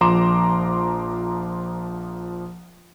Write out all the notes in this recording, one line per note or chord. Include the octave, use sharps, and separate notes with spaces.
A#1 F3 A#5 C6 D6 E7